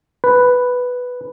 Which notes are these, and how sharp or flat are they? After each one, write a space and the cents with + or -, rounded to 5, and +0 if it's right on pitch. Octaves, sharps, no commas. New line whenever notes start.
B4 +0